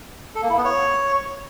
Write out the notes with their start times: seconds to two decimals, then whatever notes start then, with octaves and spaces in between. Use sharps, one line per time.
0.35 A4
0.43 A#3
0.50 E4
0.57 B3
0.65 C#5